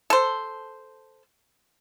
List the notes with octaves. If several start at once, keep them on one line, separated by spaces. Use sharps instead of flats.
A4 C5